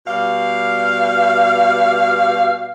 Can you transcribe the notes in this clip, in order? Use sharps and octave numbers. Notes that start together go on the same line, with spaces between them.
B2 G3 F5